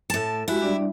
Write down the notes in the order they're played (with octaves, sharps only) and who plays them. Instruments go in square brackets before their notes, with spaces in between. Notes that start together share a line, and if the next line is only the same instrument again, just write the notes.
[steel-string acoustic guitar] A2 A5
[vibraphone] G#3 F#4 G4 [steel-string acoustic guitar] E4
[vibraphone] G3 D4 D5